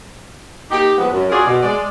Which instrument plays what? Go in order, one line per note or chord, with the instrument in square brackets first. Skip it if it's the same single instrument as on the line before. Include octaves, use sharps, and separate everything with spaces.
[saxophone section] A#3 D#4 G4
F3 G#3 B3
F#2
F4 F#4 G#4 A#4 D5
B2
G#3 D5